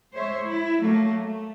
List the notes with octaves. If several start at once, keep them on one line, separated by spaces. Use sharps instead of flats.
G#3 C5 C#5 E5
E4
F#3 A3 A#3
A3